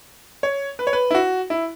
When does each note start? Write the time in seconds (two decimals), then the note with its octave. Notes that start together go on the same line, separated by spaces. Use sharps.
0.43 C#5
0.79 B4
0.87 C#5
0.93 B4
1.11 E4
1.15 F#4
1.50 E4